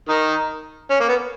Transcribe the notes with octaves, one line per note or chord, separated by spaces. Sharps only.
D#3 D#4
C#4
A#3
B3